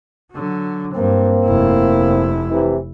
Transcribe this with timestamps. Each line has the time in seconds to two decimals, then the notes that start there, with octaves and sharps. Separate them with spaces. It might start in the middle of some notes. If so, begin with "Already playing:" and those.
0.32 D3 F#3
0.93 G2 A#3 C4
1.46 F1 E4
2.50 C3 E3